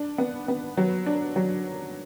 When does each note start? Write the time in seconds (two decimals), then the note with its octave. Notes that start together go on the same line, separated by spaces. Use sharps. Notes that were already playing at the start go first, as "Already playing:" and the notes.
Already playing: D4
0.18 B3
0.48 B3
0.77 F#3
1.06 D4
1.36 F#3